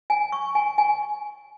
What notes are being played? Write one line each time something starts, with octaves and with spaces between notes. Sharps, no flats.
G#5
C#6
G#5
G#5